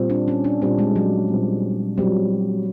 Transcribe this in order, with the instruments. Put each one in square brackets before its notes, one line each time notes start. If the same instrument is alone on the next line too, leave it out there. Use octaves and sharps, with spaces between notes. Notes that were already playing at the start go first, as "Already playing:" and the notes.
Already playing: [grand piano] A#2 G3 C4
[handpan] D4
C#4
D4
[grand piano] A#2 G3 C4 [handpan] D4
[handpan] G#3
F#3
[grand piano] A#2 G3 C4
[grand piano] A#2 G3 C4 [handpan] F#3